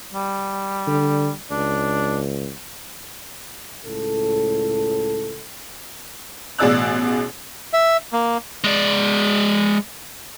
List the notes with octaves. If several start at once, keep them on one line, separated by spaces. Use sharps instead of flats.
G3
D3
C#2 D4
C#2 A2 A4
A1 B2 G#4 D5 E6 F#6
E5
A#3
G#3 D5